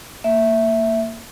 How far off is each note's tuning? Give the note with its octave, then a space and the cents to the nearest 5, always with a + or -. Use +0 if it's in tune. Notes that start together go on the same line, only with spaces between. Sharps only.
A#3 -25 E5 +0